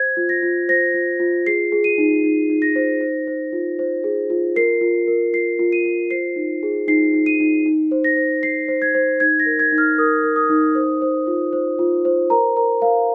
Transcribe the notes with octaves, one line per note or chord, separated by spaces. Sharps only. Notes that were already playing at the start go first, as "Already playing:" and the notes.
Already playing: C5 G#6
F4
A#6
F4
C5 A#6
F4
F4
G#4 C7
G#4
D#7
D#4
D#4
D#4
A#6
C5
C5
C5
F4
C5
G#4
F4
A#4 C7
F4
A#4
F4 C7
F4
D#7
F4
C5 C7
D#4
G#4
D#4 C7
D#4
D#7
D#4
D#4
C5
A#6
C5
C5 C7
C5
G#6
C5
D#4 G#6
A#6
A#4
G#6
D#4
F6
A#4 D#6
A#4
D#6
D#4
C5
C5
F4
C5
F4
C5
A#4 A#5
A#4 A#5
A#4 F5